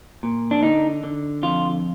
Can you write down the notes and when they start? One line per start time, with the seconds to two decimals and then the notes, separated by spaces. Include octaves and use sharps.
0.23 A#2
0.51 D4
0.63 D3 D#4
1.03 D3
1.43 F2 F4